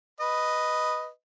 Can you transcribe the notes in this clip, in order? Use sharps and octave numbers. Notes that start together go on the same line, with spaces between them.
B4 D#5